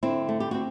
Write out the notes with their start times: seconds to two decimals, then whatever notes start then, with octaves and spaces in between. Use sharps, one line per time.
0.03 D3 C4 E4
0.29 A3
0.40 G4
0.51 C4 F#4